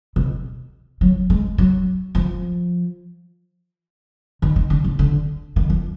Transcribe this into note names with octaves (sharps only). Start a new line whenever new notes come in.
B2
F#3
G#3
F#3
F3
D#3
D#3
D3
D3
D3
D#3
F3